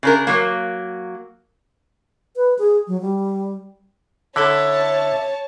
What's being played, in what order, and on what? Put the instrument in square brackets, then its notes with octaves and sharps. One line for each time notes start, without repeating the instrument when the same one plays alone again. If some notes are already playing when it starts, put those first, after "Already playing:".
[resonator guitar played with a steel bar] C#3 D4 A#4
F#3 A#3
[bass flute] B4
G#4
F#3
G3
[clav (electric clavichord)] D3 [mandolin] E4 A4 E5 [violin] C#5 A5